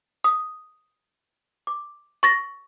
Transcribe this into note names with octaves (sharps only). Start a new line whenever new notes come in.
D#6
D6
C#6 A6 A#6